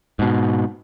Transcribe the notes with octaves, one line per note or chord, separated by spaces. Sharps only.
G#2 B2